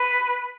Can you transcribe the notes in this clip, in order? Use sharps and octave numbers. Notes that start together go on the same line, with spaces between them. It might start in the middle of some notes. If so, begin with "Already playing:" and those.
Already playing: B4